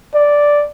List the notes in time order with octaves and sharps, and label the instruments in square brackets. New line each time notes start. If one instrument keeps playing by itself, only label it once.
[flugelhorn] D5